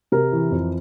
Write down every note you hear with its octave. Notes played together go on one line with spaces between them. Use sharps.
C3 A#4
E3
F2